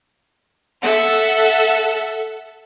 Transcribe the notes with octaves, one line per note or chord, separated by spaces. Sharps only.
A4 E5 F#5